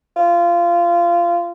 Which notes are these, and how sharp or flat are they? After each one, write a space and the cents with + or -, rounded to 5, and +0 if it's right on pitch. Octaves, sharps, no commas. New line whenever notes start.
F4 -20